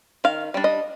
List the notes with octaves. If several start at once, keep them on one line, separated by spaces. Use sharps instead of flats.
D#3 F5
G3 D4
D#5